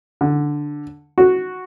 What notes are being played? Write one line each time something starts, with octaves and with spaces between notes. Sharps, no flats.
D3
F#4